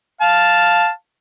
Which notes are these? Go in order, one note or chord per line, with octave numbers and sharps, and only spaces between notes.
F5 A5